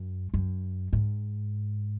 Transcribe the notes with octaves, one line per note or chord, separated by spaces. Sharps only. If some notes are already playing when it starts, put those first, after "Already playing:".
Already playing: F#2
F#2
G#2